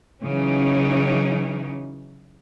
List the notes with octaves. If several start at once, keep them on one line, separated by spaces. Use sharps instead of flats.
C#3 E3 F#3 C#4 D#4